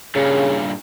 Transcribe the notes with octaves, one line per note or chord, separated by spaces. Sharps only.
G2 A#2 C#3